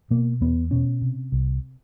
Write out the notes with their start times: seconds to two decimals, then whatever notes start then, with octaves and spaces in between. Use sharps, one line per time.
0.11 B2 A#3
0.41 E2 B3
0.71 B2 C#4
1.02 C3
1.32 C2